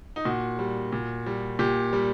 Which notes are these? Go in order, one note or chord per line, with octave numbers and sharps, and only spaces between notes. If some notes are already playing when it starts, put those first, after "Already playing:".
D#4
A#2 F#4
G3
A#2
G3
A#2 G4
G3